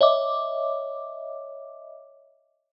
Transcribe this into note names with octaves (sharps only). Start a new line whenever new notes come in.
C#5 D#5 E5 D6